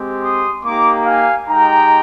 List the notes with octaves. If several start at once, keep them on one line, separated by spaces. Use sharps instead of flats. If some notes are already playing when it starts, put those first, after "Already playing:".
Already playing: G#3 C4 G4
C6 D#6
A#3 D#4 G4 A#5 D6
F5 G#5
G#3 D#4 G4 G5 A#5